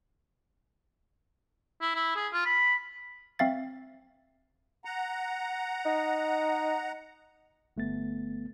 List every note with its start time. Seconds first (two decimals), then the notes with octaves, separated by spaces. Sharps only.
1.81 E4
1.95 E4
2.16 G#4
2.33 F4
2.46 B5
3.39 C4 E5 F5 A6
4.85 F#5 A#5
5.86 D#4
7.77 G1 A3 B3 A6